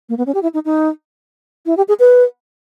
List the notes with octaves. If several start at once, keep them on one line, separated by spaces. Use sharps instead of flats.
A#3
B3
C#4
G4
E4
D#4
D#4
E4
G4
G#4
B4